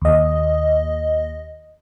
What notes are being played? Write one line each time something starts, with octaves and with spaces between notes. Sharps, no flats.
D#2 D#5